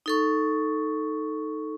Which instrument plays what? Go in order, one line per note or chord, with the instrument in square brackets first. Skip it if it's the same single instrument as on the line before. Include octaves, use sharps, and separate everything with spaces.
[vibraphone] D#4 A4 C#6